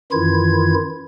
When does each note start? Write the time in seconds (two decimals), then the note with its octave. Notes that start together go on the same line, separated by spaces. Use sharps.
0.12 F#2 D#3 E3 E4 F4 G#6